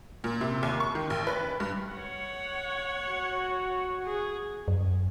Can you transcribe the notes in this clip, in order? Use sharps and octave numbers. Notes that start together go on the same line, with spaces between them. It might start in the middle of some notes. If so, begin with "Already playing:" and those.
A#2
C3
D#2
C#6
D#3
A1
B4
G2
C#5 F#5
F#4
G#4
F#2